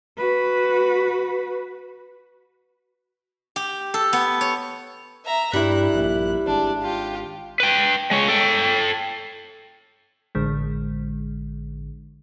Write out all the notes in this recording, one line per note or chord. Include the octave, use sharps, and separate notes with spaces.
F#4 B4
G4
A4
B3
C#5
E5 A#5
G2 G3 E4 F#6
A#1
G#1 D4
F4 G4
B4 G5
G#3 C#5
A4 G5
A1 D3 G#3